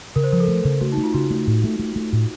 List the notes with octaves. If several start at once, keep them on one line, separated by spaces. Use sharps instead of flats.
C#3 A#4
C5
F3 A#4
A4
A3
C#3
A3 F#4
D#4
A3
F4
C#3 F#4
A3
A2
A3
A3
A3
A2